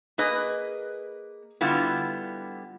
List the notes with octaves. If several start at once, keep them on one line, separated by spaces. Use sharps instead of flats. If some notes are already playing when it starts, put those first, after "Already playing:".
A#3 G#4 B4 D#5
D3 G3 B3 E4 F4